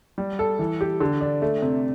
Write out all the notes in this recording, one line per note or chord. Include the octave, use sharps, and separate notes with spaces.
G3
A4
E3
G4
D3
D4
A3
C3